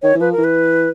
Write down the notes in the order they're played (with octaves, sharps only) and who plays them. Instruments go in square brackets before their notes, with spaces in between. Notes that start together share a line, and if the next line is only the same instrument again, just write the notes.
[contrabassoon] D#3 [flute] C#5
[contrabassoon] E3
[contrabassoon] F3 [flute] B4
[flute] A#4
[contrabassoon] E3
[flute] B4